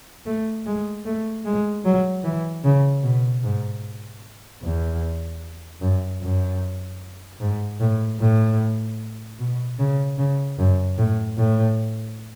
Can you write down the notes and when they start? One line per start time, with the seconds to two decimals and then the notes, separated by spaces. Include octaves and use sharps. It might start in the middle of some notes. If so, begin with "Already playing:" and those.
0.26 A3
0.66 G#3
1.05 A3
1.45 G#3
1.85 F#3
2.24 E3
2.64 C#3
3.03 B2
3.43 G#2
4.63 E2
5.82 F#2
6.21 F#2
7.41 G#2
7.80 A2
8.20 A2
9.39 B2
9.79 C#3
10.18 C#3
10.59 F#2
10.98 A2
11.38 A2